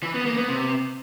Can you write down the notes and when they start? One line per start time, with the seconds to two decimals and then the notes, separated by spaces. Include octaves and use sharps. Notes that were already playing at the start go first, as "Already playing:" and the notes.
0.03 E3
0.14 B3
0.26 A#3
0.37 B3
0.48 C3